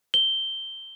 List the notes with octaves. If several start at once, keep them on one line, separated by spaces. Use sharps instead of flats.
G7